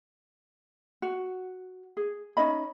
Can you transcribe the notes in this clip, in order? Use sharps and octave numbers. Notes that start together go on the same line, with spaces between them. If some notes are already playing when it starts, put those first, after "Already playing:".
F#4
G#4
C#4 D#4 D#5 B5